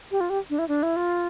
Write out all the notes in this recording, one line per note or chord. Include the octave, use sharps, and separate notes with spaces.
G4
F4
G4
D4
E4
D4
E4
F4